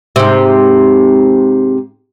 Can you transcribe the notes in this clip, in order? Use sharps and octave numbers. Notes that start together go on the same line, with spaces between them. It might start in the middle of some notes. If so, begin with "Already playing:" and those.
G#2 C3